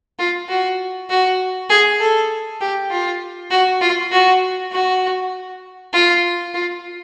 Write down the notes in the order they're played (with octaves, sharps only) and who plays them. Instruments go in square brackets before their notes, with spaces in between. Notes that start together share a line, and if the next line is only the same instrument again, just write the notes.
[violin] F4
F#4
F#4
G#4
A4
G4
F4
F#4
F4
F#4
F#4
F4
F4